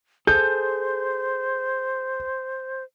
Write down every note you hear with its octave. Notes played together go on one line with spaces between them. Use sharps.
G#4 A4 C5 G6